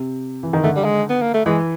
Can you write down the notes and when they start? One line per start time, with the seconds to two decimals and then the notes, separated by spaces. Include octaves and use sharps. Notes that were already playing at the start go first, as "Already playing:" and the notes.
Already playing: C3
0.43 E3
0.53 D#3
0.64 D3 A3
0.76 G3
0.84 G#3
1.10 B3
1.22 A#3
1.34 A3
1.46 E3 G#3